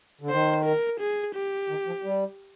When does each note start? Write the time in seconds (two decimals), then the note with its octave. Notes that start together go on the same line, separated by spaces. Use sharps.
0.21 D3
0.30 D#3 C5
0.65 A#4
1.00 G#4
1.35 G4
1.69 D#3
1.86 F3
2.03 G3